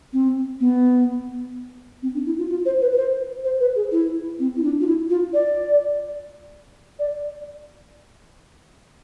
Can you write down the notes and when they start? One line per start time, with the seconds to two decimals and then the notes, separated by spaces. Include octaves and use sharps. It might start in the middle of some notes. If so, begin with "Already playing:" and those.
0.13 C4
0.60 B3
2.03 C4
2.14 D4
2.26 E4
2.38 F4
2.50 F4
2.66 C5
2.82 B4
2.92 B4
2.97 C5
3.44 C5
3.60 B4
3.76 G#4
3.92 E4
4.39 C4
4.57 E4
4.63 D4
4.81 F4
4.87 E4
5.10 F4
5.34 D5
6.99 D5